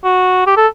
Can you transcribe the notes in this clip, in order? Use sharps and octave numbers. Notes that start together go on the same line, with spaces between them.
F#4
G4
A4